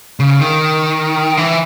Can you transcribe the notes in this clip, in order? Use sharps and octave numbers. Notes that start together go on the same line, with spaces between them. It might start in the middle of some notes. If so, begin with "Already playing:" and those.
C#3
D#3
E3